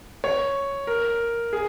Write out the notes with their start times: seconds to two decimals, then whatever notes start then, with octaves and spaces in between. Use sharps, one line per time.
0.24 C#5
0.87 A#4
1.53 G#4